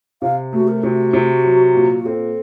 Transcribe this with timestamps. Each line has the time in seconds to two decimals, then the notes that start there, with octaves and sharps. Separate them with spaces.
0.22 C3 F5
0.53 A3 F#4
0.67 A#4
0.83 C3 F#4
1.13 C3
1.44 F#3
1.75 A#2
1.99 F#4
2.06 C4 A4